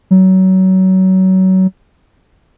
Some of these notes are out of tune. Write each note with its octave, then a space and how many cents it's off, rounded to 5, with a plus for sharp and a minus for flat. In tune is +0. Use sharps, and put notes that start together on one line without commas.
F#3 +25